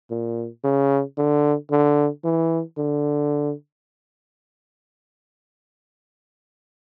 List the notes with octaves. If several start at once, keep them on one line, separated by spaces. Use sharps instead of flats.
A#2
C#3
D3
D3
E3
D3